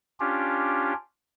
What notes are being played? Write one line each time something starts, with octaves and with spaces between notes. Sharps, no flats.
C#4 D4 F4 G4